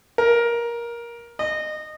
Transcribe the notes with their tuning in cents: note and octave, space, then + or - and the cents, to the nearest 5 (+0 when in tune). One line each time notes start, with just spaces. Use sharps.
A#4 +15
D#5 -20